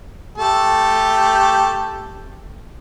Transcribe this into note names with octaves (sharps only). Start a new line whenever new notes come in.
A3 G4 A4